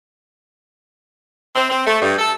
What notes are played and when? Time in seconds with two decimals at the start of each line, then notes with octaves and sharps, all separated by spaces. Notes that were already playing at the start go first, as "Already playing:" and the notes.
1.56 C4
1.70 C4
1.86 A3
2.02 G2
2.18 A4